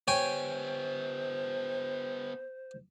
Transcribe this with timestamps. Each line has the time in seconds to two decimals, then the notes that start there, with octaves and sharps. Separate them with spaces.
0.08 B3 G4 C5 C#5 G5 G#5